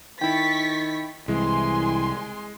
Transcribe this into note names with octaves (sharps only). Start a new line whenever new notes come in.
D#3 E4 G5 C#6 A6 B6
C2 E3 G#3 G#5 C6